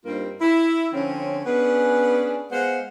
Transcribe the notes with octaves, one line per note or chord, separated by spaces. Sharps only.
G2 G3 A#3 C4 D#4 F4
E4
D3 F3 C4 C#4
B3 C#4 D4 G#4 B4
G#3 B3 C5 F5 F#5